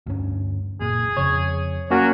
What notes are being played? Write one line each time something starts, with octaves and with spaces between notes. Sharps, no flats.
D2 G2 C#4
F#1 A#2 G#4
F2 C#3 F3 C#5
F#3 A#3 C#4 F#4